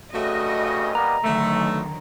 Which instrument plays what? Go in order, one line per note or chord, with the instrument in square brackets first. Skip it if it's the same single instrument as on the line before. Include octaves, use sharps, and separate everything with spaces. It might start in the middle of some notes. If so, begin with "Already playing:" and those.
[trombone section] G2 C#3 [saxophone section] A3 F#4 [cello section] D#5
[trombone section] G3 A#3 B3 [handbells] A#5
[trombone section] B1 [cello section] D3 D#3 F#3 [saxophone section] A3